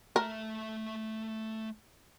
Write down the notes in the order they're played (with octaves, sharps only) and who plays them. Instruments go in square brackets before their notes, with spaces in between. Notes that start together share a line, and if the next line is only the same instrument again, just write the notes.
[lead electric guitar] A3 E5 [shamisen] A#4